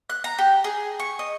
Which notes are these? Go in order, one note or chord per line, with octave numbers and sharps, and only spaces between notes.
F#6
A#5
G4
G#4
C#6
D#5